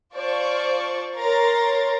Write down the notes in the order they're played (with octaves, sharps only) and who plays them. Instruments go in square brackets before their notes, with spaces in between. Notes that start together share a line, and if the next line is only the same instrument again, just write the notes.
[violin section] F4 C5 D5 A5 C#6
A#4 C#5 A#5 C6 A6